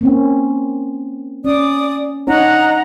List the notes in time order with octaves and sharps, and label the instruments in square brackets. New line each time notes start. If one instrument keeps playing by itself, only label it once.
[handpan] A#3 C4 C#4
[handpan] C#4 [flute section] D5 D#6
[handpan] D4 D#4 C#5 [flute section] D#5 F#5 A#5